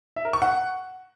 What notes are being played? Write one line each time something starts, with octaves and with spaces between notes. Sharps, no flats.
E5
A#4
C#6
F#5